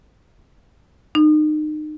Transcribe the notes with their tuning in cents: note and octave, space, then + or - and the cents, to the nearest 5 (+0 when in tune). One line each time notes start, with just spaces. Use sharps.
D#4 -30